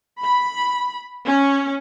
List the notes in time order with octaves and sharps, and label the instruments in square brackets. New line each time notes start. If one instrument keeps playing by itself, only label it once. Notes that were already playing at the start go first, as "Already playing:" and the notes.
[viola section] B5
C#4